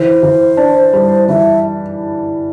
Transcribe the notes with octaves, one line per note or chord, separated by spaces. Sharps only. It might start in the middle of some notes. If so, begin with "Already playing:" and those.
Already playing: E3 C5
E3
D4
G3
E3 E5